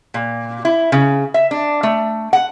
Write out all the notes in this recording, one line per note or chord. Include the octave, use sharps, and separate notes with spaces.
A#2
E4
C#3
E5
D4
A3
F#5